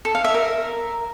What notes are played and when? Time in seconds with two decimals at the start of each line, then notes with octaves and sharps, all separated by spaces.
0.05 A4
0.15 F5
0.24 E5
0.34 A#4